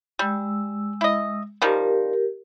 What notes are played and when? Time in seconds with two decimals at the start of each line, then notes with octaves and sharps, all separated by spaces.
0.19 G3 G#3 E6
1.01 E4 D#5
1.62 D#3 F3 G3 G4 A#4